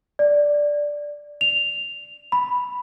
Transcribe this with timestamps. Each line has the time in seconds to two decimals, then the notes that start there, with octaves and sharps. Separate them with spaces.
0.19 D5
1.41 F7
2.32 B5